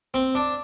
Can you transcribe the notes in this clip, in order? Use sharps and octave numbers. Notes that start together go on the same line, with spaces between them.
C4
D4